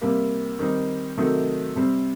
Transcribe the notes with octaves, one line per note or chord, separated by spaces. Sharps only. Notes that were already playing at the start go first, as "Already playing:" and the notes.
C3 G3 A#3
D#3 G3 C4 D#4
C3 D#3 F#3 A3 D#4
C3 G3 C4